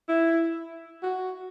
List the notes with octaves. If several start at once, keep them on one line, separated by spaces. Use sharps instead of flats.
E4
F#4